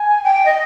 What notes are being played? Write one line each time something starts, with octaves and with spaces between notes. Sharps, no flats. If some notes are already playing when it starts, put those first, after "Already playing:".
Already playing: G#5
G5
D#5